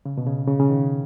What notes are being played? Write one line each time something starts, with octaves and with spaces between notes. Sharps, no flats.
C#3
B2
C#3
C#3
C#3
D#3